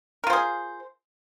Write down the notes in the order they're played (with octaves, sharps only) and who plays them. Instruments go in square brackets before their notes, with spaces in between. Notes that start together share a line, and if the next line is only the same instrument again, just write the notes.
[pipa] A#4
F4
C5
G#4